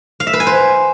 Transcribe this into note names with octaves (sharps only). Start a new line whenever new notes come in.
F5
E5
B4
G#5
C5